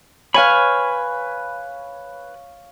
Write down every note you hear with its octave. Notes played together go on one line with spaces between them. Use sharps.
B4 C#5 F5 G#5 B5